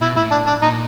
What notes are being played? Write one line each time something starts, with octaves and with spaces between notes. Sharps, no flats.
B2 E4
A2 E4
D4
D4
A#2 D#4